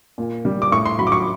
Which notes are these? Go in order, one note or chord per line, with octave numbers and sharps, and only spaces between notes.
A#2
G3
D6
A2 C#6
C6
F#3 B5
D6
C#6